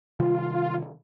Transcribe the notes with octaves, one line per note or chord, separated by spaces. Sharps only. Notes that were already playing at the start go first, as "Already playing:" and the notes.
C3 D#3 G3 F4